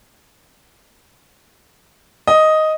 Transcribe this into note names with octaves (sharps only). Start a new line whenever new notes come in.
D#5